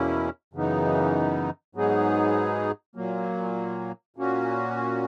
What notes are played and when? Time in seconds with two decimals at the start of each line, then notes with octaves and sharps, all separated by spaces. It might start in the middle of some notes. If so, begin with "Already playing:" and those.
Already playing: E2 B2 A#3 C#4 E4
0.53 F#2 C#3 E3 B3 D#4
1.75 G#2 F#3 B3 D#4 G#4
2.95 A#2 F#3 A#3
4.16 A#2 A#3 C#4 F#4